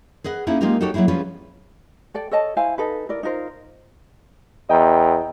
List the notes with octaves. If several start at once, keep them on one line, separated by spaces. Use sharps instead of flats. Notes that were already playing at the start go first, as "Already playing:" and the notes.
G#4 B4 D#5 F#5
A#3 C#4 D#4 E4 G#4
G#3 A#3 D#4 F4 G4 A#4
D#4 F#4 G4 A4 C#5
F#3 A#3 D#4 E4 G#4
F3 G3 C#4 F4 G#4 B4
A4 D5 G5
A4 C#5 D#5 A5
E4 C5 F5 G#5
D#4 A4 B4
E4 A#4 D5
D#4 F4 A#4 C5
E2 D#5 G5 A#5